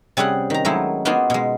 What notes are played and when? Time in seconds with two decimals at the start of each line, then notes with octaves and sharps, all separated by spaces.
0.17 C3 G3 C#4 G#4 F#5
0.50 D#3 A#5
0.65 D#3 F#3 G#3 A3 D#4 E4
1.05 A#3 B3 D#4 F4 F#4 G#4
1.30 B2 G#3